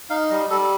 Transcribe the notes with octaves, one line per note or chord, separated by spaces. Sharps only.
D#4 F5
G3 D#5
G3 A4